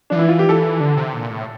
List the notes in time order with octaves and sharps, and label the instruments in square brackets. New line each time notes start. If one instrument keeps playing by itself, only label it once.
[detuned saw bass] F3 [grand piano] D4
[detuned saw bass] E3 [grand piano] E4
[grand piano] F4
G4
[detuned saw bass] E3 [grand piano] A4
[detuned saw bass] D3
C3
A#2
A2